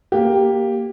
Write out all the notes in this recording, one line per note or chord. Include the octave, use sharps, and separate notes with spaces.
A#3 G4